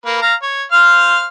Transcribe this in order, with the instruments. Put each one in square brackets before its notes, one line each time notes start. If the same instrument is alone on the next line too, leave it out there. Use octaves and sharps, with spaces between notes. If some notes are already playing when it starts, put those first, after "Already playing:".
[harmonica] A#3 B4
F5 A#5
C#5
C5 F5 F6